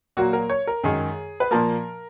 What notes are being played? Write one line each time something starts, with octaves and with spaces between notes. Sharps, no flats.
A#2 F#3 A#3 F#4
A#4
C#5
A#4
F#2 D#3 G#3 G#4
B4
A#2 F3 A#3 A#4